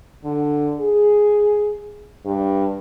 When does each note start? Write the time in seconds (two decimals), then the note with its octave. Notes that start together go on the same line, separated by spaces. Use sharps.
0.24 D3
0.80 G#4
2.25 G2